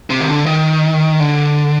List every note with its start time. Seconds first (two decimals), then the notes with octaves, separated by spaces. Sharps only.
0.10 C3
0.20 D#3
0.28 D3
0.46 D#3
1.20 D3